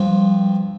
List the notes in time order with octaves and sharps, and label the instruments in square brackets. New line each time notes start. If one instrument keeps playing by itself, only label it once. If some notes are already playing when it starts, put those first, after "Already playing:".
Already playing: [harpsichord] G2 F3 C4 F4 C5